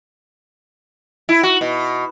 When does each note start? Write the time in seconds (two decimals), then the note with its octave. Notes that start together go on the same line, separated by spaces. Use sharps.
1.29 E4
1.43 F#4
1.61 B2